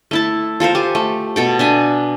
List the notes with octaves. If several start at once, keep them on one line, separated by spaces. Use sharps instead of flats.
A3 E4 A5
F4 A4 A#4 C5
G4 G#5
A3
B2 A4 G5
D4 E5 G#5